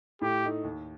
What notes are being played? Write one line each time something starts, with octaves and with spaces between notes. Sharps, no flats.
A2 G4
A3 D#4
D#2